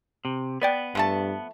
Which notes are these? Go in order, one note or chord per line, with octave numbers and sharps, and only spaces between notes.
C3
B3 B4 D5 G5
G2 F3 A3 A5